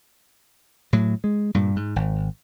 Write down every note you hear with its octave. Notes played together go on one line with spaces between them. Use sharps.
A2 F#3
G#3
G2 A#2 G3
G#2
G#1